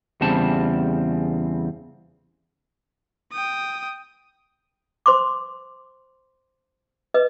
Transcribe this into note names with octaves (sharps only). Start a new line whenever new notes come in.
E2 C#3 G3 C4 A5
G5 D#6
C5 C6 D6
B4 D#5